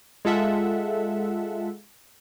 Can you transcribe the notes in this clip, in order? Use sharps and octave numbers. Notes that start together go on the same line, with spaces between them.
G#3 F4 A4 E5 F#5